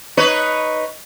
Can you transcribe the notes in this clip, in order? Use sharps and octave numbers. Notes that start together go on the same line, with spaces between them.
D#4 B4 C#5